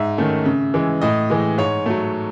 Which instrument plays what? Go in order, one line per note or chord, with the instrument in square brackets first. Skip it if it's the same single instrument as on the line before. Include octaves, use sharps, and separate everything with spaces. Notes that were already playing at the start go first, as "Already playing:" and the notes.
Already playing: [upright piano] G#2 E5
D#3 A3 C#4
C#3
E3 G#3
A2 D#5
E3 G#3
G#2 C#5
F#3 A3